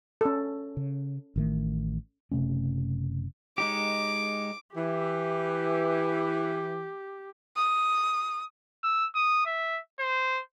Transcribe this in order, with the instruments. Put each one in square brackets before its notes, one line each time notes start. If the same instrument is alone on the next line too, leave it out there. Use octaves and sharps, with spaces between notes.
[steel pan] C#4 A4
[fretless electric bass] C#3
A1 D#3 A3
[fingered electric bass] F#1 C3 A3 C#4
[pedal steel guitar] G#3 D#4 G4 [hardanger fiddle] D6
[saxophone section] E3 [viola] G4
[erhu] D#6
[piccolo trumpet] E6
D#6
E5
C5